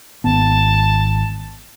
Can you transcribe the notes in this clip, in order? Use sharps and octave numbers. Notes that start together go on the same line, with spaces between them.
G#1 B3 A5